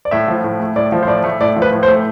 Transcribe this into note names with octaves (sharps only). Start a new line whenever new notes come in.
D5
A2 E5
F3
A2
A3
A2 D5
F3
C5
A2 D5
A3
A2 D5
F3
B4
A2
C5
A3